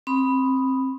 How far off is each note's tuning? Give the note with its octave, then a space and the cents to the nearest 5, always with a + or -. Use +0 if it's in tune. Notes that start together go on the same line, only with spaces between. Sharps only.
C4 +20 B5 +0 D#6 +0